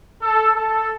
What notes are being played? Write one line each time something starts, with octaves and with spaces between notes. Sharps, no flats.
A4
A4